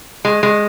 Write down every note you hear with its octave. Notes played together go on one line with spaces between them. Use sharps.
G#3
G#3